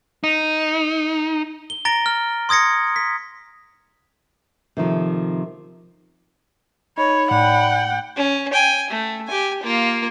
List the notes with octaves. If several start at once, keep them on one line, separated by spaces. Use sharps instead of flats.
D#4
G7
A#5 A6 A#6 D7 G7
F6
C6 D#6 G#6 A#6 C#7
B6
C3 D#3 F3 A3
D#4 C#5 B5
A2 D5 F#5 G5
C#4
G5 G#5
A3
G4 G#5
A#3 F4